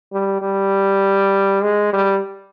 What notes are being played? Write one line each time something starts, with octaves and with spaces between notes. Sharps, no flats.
G3
G3
G#3
G3